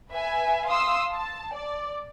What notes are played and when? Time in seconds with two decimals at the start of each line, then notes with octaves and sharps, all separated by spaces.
0.10 B4 E5 G#5
0.66 F5 C6 D#6 E6
1.12 A5
1.54 D5